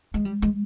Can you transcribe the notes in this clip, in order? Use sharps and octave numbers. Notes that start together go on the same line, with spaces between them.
G#3
G3
G#3